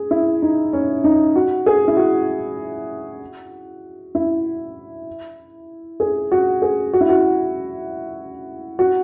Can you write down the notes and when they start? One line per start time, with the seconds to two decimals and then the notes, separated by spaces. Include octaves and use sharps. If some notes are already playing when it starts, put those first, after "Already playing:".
Already playing: G#4
0.11 E4
0.42 D#4
0.73 C#4
1.04 D#4
1.36 F#4
1.66 G#4
1.88 E4
1.97 F#4
4.15 E4
6.00 G#4
6.32 F#4
6.62 G#4
6.93 F#4
7.01 E4
7.09 F#4
8.79 F#4